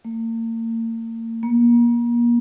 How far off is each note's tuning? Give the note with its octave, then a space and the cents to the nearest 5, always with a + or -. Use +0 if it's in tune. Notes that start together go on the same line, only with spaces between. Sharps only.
A#3 -40
A#3 +30